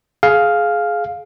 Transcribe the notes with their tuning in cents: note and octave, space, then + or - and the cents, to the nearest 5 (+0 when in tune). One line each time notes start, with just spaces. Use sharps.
G#4 +20 F5 +5